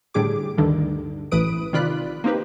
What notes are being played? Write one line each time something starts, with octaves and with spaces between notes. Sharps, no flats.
A2 D3 G3 G#4 D6
D2 G2 D3 D#3
A1 A2 E3 B4 D#6 D7
C3 D#3 F4 D5 B5 F#6
A#3 C4 D#4 G4 B4